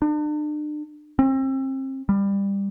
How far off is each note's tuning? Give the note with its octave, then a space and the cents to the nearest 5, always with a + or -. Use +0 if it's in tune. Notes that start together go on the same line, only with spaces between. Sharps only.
D4 +40
C4 +35
G3 +20